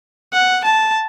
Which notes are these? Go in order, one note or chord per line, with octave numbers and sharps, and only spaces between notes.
F#5
A5